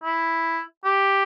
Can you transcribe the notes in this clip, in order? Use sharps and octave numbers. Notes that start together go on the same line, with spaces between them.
E4
G4